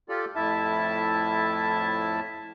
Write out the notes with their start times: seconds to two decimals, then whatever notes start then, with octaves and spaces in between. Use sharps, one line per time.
0.09 F4 G4 A4 D5
0.36 F2 A2 E4 E5 A5